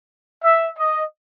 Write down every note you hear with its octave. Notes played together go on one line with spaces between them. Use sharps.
E5
D#5